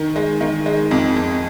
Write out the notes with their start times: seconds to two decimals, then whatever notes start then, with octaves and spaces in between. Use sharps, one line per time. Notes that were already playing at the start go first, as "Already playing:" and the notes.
Already playing: D#3
0.16 G#3
0.41 D#3
0.66 G#3
0.91 F2
1.16 F2